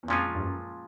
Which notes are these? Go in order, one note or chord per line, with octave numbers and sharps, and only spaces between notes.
E2
F2 A#2 F3 G#3 C#4 F4
G2
F#2